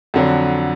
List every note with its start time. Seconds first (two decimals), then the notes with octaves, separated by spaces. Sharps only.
0.14 F2 D3 F#3